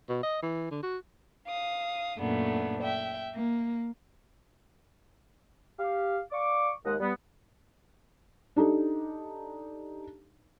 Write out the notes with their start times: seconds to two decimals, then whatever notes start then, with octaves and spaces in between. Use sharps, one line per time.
0.09 B2
0.23 D#5
0.42 E3
0.71 D3
0.83 F#4
1.47 F5 D#6
2.18 F#2 A#2 A3 B3 D4
2.82 E5 G5
3.34 A#3
5.78 G4 F5
6.32 D5 F5 C#6 D6
6.85 D#2 G#3 A#4 D#5 F#5
7.00 G3 B3
8.56 D4 D#4 G4 A4